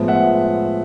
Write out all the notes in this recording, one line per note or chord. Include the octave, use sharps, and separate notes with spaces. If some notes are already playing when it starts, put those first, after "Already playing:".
Already playing: A2 F3 G#3 B3
E5 F#5